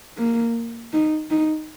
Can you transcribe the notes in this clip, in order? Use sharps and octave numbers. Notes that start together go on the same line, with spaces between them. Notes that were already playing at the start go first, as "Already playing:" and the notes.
A#3
D#4
D#4